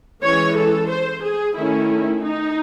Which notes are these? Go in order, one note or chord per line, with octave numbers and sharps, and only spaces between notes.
E3 G#3 C#4 C#5
A4
C5
G#4
D#3 A3 C#4 E4
D#4